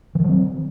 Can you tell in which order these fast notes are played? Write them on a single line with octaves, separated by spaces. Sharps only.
E3 D#3 F#3 C4